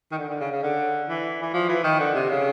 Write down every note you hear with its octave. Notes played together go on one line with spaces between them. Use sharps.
D#3
D3
D3
C#3
C#3
D3
E3
E3
F3
E3
D#3
D3
C3
C#3